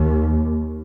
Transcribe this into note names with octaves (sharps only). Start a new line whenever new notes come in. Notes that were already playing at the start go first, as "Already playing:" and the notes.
Already playing: D#2